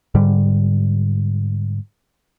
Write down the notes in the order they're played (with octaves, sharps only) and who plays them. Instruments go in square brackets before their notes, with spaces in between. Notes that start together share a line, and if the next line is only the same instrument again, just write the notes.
[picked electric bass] G#2 D3 G3